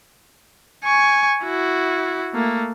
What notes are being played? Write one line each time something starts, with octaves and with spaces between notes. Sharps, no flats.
G#5 C#6
E4 F#4
A3 A#3